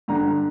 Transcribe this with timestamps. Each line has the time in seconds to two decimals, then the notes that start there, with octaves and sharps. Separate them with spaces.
0.08 G2 D3 A#5